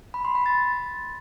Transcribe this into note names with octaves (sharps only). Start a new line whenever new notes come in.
B5
C6
B5
A6